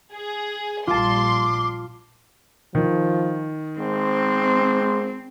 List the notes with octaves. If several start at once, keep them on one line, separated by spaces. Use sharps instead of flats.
G#4
A#1 A#2 G3 F4 A5 C6 D6
D#3 F3
G#1 G#3 C4 C5